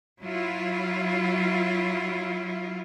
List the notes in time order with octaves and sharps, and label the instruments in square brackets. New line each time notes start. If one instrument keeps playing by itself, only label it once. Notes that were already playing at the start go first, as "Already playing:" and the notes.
[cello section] F#3 E4 F4